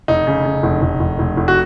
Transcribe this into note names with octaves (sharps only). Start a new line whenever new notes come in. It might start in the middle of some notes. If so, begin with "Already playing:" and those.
F1 D#4
C#3
C#3
F1
F1
F1
F1
F1
F#4